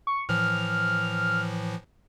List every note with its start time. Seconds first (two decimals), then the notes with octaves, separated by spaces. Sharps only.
0.07 C#6
0.29 A2 E3 F3 F6